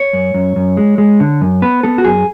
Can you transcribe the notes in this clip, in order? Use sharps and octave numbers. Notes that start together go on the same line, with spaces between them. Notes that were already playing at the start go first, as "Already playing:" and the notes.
Already playing: C#5
F#2
F#2
F#2
G#3
G#3
D3
F#2
B3 B4
B3 A4
F#4
F#2 G#4